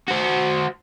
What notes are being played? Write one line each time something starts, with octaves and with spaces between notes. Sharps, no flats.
F#4 C5